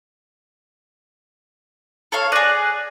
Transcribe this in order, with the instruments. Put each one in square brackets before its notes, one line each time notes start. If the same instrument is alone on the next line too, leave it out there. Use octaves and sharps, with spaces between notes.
[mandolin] A4 C#5 F5
[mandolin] G#4 D5 [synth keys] F#6 A#6 D#7